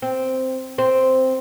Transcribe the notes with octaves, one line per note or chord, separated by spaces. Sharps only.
C4
C4